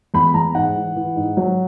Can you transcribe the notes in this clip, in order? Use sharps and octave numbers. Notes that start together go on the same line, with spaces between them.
E2 B5
E2 A#5
G#2 F#5
E3
E3
G#2
F#3